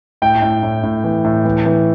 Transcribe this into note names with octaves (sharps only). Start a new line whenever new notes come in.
A2 G5
A2
A2
A2
E3
A2
E3
E3